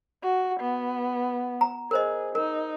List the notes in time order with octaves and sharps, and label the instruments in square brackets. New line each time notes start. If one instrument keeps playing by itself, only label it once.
[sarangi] F#4
B3
[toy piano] A#5
[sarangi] G#4 [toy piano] A#4 C5 D#5
[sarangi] D#4 [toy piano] A#4